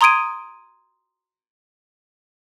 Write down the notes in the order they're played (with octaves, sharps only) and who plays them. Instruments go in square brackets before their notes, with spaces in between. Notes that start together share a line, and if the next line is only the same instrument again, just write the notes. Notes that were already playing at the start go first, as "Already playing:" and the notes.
[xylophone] A#5 C6 D#6 G#6 D7 D#7